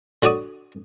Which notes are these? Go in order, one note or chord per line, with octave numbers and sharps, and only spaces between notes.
D3 F#4 C#5 D5 D#6